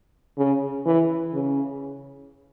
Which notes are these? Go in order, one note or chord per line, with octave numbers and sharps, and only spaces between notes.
C#3
E3
C#3